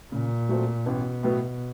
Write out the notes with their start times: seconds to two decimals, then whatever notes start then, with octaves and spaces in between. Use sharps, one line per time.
0.12 A#2 C#3
0.49 F#3 A3 C4
0.86 A1 B2
1.23 A2 F#3 B3